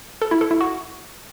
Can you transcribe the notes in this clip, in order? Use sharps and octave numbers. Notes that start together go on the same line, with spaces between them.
A4
E4
A4
E4
F#4